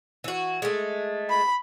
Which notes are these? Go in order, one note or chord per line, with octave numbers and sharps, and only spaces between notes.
E3 F#4
G#3 A3
B5